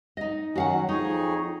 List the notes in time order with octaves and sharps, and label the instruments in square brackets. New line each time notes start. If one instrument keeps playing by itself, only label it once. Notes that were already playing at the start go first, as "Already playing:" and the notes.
[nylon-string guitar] D#4 D#5
[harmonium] D#3 F#3 C#4 [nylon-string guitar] F#4 F5 F#5
[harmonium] F2 G#4 C#5 [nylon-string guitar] D#4